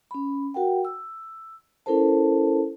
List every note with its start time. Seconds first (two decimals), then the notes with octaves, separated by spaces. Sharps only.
0.11 C#4 B5
0.54 F#4 A#4 F#5 G5
0.85 E6
1.86 C#4 E4 A4 A#4 C5 A5